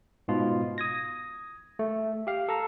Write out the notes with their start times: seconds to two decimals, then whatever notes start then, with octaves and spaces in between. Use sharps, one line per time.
0.28 G#2 B2 F4
0.78 D#6 G#6 A#6
1.79 A3
2.27 G4 F5
2.49 A4 A#5